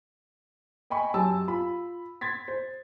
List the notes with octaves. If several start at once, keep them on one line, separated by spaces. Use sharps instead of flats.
D#5 G5 G#5 B5 C#6
F#2 G4 G#5 A5 E6
F4 B5
C6 G#6 A6 B6
C5